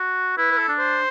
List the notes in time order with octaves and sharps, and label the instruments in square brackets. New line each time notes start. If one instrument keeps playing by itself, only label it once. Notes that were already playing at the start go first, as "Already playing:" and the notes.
Already playing: [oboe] F#4
[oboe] E4 [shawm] B4
[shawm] B4
A4
[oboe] D4
[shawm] C5